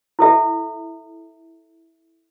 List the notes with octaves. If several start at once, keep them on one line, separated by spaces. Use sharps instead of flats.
E4 A4 E5